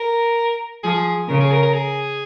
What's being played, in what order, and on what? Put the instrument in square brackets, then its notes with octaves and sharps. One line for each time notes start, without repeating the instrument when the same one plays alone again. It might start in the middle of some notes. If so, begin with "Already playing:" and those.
Already playing: [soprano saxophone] A#4
[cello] F3 [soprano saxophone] G#4
[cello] C#3 [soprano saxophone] A#4
[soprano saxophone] G#4
A#4
A#4
G#4